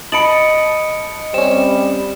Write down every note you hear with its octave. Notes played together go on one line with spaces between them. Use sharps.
D#5 A5 B5 C#7 D7 F#7
G3 C4 C#4 E7